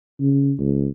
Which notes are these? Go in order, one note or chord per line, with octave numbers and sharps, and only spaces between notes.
C#3
C#2